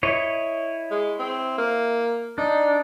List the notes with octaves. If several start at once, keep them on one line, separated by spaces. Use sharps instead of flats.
E4 C#5 D#5
G#3
C4
A#3
D4 D#4